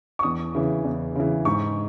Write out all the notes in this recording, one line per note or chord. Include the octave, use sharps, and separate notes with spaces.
C#6
E2 D#6
C#3 E3
E2
C#3 E3
G#2 C#6